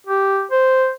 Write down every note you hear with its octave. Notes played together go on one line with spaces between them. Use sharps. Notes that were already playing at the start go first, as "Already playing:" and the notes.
G4
C5